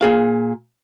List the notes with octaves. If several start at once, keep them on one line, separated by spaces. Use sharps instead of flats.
A#2 G#4 F5